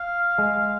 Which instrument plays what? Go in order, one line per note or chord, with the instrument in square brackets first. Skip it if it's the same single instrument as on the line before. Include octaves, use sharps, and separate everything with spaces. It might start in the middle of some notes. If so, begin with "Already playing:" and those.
Already playing: [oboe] F5
[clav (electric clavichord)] G#3